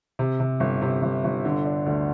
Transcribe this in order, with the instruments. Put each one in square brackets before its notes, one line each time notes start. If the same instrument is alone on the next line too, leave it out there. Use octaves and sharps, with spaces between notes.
[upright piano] C3
C3
G1
C3
G1
G1
D3
D4
D2